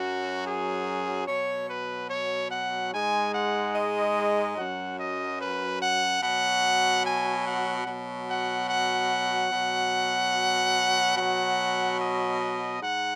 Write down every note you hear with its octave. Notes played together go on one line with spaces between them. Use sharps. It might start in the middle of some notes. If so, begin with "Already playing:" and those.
Already playing: F#2 F#3 F#4
G#4
B2 F#3 C#5
B4
C#5
F#5
G#2 G#3 G#5
F#5
D#5
F#2 F#3 F#5
D#5
B4
F#5
B2 F#3 F#5
G#5
F#5
B2 F#3
F#5
F#5
B2 F#3
B2 F#3 F#5
D#5
G#2 F#5